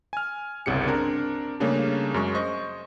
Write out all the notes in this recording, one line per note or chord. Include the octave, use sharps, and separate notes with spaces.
G#5 F6
G1 C2 C#3 G4 C#7
C4 D4 A#4
C#3 G3 A3 A#3 C#4 D4
F#2 G#3 C#6
C5 D#5 C#6